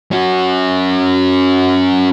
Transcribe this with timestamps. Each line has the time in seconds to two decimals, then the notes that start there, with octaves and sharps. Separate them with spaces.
0.12 C#4 F#4